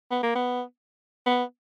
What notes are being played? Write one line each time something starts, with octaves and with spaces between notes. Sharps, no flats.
B3
A#3
B3
B3